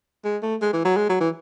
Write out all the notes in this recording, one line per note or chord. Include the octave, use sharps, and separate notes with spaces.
G#3
A3
G#3
E3
F#3
G#3
F#3
E3